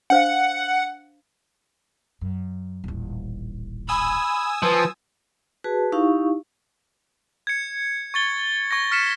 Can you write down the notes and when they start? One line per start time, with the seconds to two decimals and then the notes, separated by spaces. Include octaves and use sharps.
0.10 D4 C5 F5 F#5
2.21 F#2
2.84 D#1 A1
3.89 G#5 B5 D#6 E6
4.63 F3 B4
5.64 F#4 G#4 B4 A5
5.92 D#4 E4 G4 F5 C#6
7.47 G#6 C#7
8.14 C#6 A6 G7
8.71 C#6 G#6 A#6
8.91 C#6 F6 B6 C#7 E7